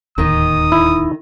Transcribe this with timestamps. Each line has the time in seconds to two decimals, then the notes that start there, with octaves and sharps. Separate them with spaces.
0.18 D1 D#2 D#3 D#4 D#6
0.72 E4